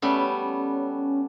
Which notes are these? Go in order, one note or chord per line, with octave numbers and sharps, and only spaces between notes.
G3 A3 B3 C#4